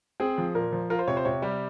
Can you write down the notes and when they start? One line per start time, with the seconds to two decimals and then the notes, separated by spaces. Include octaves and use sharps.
0.20 C4 G#4
0.38 F3
0.55 A#2 A#4
0.72 F3
0.90 F4 A#4
0.99 C5
1.08 C3 C#5
1.17 C5
1.25 C3 C#5
1.42 G3 G4